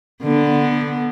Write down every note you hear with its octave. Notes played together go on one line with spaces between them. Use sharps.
D3 B3